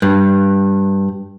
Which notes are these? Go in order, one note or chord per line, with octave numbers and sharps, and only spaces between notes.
G2